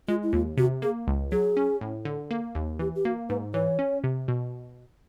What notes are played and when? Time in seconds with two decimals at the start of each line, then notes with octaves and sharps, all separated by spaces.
0.08 G#3 F4
0.23 E4
0.33 D#2 F4
0.57 C3 F#4
0.82 A#3 G#4
1.07 C#2
1.32 F#3 G#4
1.57 C#4
1.81 A2
2.05 D3
2.31 A#3
2.55 D#2
2.79 E3 G4
2.95 G4
3.05 A#3 F#4
3.29 G#2 B4
3.54 E3 C#5
3.79 C#4
4.04 C3
4.28 B2